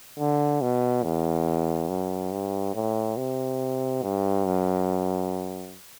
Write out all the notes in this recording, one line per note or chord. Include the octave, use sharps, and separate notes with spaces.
D3
B2
E2
F#2
G2
A2
C3
G2
F#2